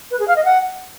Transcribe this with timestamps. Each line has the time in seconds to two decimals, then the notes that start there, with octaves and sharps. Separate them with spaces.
0.11 B4
0.20 G#4
0.28 F5
0.36 D#5
0.45 F#5